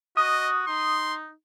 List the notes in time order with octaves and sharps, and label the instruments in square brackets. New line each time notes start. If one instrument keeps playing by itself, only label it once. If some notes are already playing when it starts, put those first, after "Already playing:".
[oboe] F#4 [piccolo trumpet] D#5 [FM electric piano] D#6
[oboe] D#4 [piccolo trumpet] C6